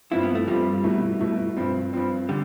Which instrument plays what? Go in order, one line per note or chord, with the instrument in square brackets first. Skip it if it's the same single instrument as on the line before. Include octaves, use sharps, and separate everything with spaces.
[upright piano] G2 F3 C4 F4 [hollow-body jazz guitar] E4
[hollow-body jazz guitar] B3
A3
[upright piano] G2 F3 C4 F4 [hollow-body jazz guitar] G3
[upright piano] B2 A3 E4
B2 A3 E4
G2 F3 C4
G2 F3 C4
[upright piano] D3 [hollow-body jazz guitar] G3